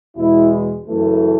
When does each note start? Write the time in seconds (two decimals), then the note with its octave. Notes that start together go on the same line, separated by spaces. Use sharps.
0.16 E2 B2 G#3 E4
0.87 F#2 C#3 E3 A3